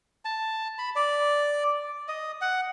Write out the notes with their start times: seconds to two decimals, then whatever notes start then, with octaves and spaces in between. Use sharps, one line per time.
0.25 A5
0.79 B5
0.96 D5
2.08 D#5
2.41 F#5